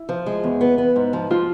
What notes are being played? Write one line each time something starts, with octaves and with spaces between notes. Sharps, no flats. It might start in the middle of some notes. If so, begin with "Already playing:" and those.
Already playing: E4
F3
G#3
E2
B3
B3
G#2
F3
F3 F4